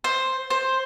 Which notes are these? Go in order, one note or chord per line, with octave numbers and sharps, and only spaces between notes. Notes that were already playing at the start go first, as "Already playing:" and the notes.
C5
C5